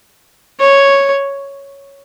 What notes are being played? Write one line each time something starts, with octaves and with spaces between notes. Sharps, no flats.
C#5